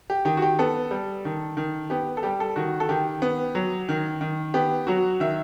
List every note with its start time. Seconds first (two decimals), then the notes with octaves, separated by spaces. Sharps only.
0.10 G4
0.25 D#3 G4
0.37 F#4
0.42 G4
0.59 B3 A4
0.91 G3
1.25 D#3
1.57 D#3
1.90 B3 G4
2.17 A4
2.23 G3 G4
2.40 A4
2.56 D#3 F#4
2.80 A4
2.89 D#3 G4
3.22 B3
3.55 F#3
3.89 D#3
4.21 D#3
4.54 B3 G4
4.87 F#3 F#4
5.20 D#3 E5